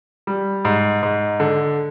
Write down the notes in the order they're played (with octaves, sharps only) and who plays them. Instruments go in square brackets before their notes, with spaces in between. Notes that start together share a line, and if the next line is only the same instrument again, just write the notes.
[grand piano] G3
G#2
G#2
D3